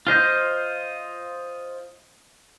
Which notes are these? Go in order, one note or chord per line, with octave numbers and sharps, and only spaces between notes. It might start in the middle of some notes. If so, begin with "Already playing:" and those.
F4 C5 D#5 G6